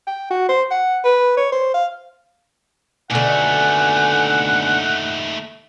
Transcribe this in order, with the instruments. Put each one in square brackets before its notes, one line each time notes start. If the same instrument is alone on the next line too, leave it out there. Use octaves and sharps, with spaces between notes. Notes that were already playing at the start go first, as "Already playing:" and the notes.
[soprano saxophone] G5
F#4
C5
F#5
B4
C#5
C5
F5
[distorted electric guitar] D#2 A3 [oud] B2 D3 [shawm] F#5 [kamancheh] G#5